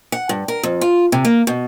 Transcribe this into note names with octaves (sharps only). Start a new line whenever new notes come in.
F#5
G2
A#4
F2
F4
C3
A#3
B2